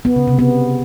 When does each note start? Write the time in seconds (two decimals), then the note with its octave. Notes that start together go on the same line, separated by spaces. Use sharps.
0.05 B3
0.16 C#3
0.27 C3
0.39 B3